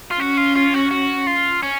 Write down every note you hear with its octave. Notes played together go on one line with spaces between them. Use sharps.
F4
C#4 F#4
F4
F4
F#4
F#4
F4
C#4